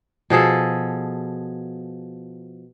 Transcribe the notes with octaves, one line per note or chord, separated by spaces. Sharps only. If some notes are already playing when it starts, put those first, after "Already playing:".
B2 F3 G#4 A4